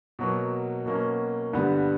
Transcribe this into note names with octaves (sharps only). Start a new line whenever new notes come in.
B2 F#3 A#3
B2 F#3 A#3 C#4
G2 D3 G3 B3